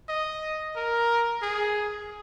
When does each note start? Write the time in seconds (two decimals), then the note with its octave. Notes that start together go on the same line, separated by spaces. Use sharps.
0.09 D#5
0.76 A#4
1.42 G#4